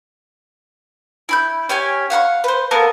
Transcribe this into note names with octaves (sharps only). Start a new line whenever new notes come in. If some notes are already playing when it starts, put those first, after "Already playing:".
E4 B5 G6
C#4 G4 C#5 G#5
F5 F#5 B5 C#6
B4 C5
A#3 B3 A4 A#4